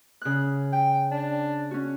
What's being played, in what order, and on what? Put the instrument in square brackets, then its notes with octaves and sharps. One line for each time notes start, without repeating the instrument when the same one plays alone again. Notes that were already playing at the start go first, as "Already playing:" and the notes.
[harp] C#3 F#6
[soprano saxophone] G5
D4
[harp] C#4 F#4